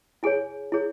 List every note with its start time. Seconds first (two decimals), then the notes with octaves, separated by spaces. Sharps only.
0.23 E4 G#4 C#5 G#5
0.72 E4 G#4 C#5